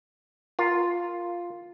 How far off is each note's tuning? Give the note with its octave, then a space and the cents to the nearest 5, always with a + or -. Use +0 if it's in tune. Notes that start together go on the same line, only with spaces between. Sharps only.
F4 +0 A#4 +0